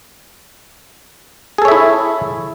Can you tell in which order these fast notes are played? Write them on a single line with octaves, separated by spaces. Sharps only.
G#4 A4 C#5 E5 E4